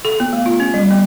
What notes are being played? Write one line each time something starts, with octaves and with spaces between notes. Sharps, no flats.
A4
B3
A3
F4
C#4
G3
B3